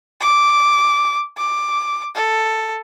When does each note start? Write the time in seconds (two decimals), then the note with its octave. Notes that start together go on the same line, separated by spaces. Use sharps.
0.21 D6
1.37 D6
2.15 A4